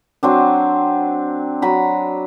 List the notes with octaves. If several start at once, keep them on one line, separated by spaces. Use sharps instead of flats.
F#3 C4 D4
F#3 A#5 B5